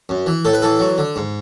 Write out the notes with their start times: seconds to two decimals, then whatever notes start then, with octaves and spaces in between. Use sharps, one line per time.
0.09 F#2
0.26 E3
0.45 A2 A4
0.53 B4
0.62 E3 A4
0.79 F#3
0.98 D3
1.16 G#2